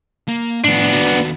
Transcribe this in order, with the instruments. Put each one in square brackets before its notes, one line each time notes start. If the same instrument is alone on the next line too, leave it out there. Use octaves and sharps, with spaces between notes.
[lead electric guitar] A#3
[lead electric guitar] A2 F3 [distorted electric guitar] B3 D4
[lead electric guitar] D#2 F#4